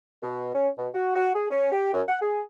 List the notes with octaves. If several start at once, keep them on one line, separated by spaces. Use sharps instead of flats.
B2
C#4
B2
F#4
F#4
G#4
C#4
G4
F#2
F#5
G#4